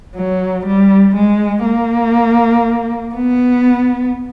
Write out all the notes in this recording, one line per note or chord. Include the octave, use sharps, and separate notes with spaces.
F#3
G3
G#3
A#3
B3